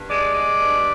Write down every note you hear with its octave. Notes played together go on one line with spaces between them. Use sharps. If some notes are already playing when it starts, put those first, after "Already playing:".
Already playing: G2
G#3 D5
G#3
G2